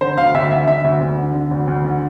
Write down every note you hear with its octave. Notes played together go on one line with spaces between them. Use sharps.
D3 C5
D2 F5
D2 E5
D3 E5
D3 E5
D2
D2
D3
D3
D2
D2
D3